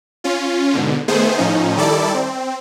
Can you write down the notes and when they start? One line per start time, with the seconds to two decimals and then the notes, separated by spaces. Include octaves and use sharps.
0.24 C#4 F4
0.73 G#2 B2 D3
1.08 D#3 A3 B3 G#4 C5
1.38 A2 F3 C#4 D#4
1.77 D#3 G3 E4 A4 D5
2.14 C4